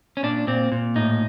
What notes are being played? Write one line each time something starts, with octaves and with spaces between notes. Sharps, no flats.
C#4
A#2 D4
A#2 C4
A#2
A2 D#4